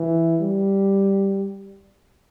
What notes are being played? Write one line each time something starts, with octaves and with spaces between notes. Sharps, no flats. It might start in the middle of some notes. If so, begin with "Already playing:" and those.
Already playing: E3
G3